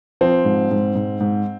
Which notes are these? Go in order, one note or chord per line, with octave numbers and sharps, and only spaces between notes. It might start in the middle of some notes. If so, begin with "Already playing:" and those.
F3 C4
G#2
G#2
G#2
G#2